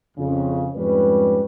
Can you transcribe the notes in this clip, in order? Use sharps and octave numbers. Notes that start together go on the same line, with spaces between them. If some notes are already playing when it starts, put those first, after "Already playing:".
F2 C#3
F2 G#2 G3 C#4 B4